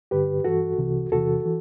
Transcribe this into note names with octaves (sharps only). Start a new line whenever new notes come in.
G2 D3 G4 B4
G2 E3 F#4 A4
C2 C3 E3
E2 C3 E3 F#4 A4
E3